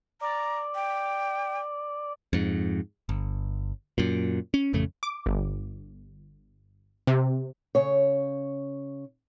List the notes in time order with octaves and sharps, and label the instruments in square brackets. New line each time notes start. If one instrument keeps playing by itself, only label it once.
[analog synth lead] D5 [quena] A#5
[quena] G5
[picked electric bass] F2 G#2
G1
F#2 A#2
C#4
A1 F2 C#3 A3
[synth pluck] D6
G1
C3
[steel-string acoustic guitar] C#3 C#5